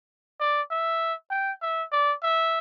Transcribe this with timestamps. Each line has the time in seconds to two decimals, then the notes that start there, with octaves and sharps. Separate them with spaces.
0.40 D5
0.71 E5
1.31 G5
1.62 E5
1.92 D5
2.23 E5